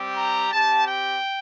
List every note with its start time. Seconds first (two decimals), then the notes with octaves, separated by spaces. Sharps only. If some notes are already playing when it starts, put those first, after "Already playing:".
Already playing: G3 C4 G4
0.16 A#5
0.52 C4 G4 A5
0.88 G5